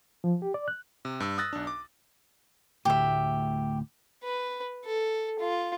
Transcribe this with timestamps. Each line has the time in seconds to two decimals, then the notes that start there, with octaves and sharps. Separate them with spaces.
0.24 F3
0.42 G4
0.54 D5
0.68 F#6
1.05 C3
1.20 G2 E6
1.38 D#6 E6 F#6 A6 A#6
1.53 B1 D4
1.67 D6
2.85 D2 A2 G4 E5
4.24 B4
4.86 A4
5.39 F4